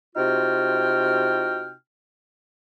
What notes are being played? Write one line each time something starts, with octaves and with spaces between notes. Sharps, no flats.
C3 D#4 F4 F#4 G5 F6